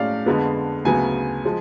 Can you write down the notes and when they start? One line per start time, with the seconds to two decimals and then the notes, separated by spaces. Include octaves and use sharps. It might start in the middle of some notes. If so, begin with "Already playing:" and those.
Already playing: A2 G#3 C#4 D5 F5
0.26 F2 D3 G#3 B3
0.85 D2 C#3 F#3 B3 G#5
1.45 F3 G#3